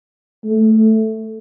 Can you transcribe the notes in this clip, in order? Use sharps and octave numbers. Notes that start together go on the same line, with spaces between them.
A3